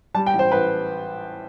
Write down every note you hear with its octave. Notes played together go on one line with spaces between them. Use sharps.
G3 A5
G5
A1
C5
A1 B4